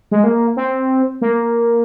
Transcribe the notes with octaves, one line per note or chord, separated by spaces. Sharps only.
G#3
A#3
C4
A#3